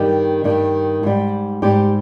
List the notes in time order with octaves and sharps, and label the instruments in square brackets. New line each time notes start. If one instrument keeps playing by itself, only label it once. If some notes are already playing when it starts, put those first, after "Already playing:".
Already playing: [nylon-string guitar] G2 D#3 G3 G4
G2 D#3 G3
G#2 G3
G#2 G3 G4